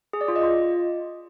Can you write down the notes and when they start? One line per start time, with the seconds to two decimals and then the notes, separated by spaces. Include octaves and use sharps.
0.13 G#4
0.21 D5
0.28 F4
0.36 D#5
0.43 F4